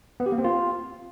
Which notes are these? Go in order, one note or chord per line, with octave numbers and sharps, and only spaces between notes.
B3
G4
A#3
C4
F4